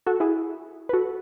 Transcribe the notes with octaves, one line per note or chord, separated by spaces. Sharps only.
F#4 A4
E4 G#4
B4
F#4 A4